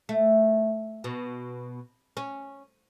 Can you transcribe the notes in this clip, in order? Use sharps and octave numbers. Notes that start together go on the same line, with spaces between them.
A3
B2
C#4